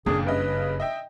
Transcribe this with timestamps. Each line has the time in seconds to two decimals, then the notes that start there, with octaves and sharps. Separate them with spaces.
0.06 F#1 F2 A#2 D4 G#4
0.27 G2 C#3 B4 D#5
0.80 D#5 E5 G5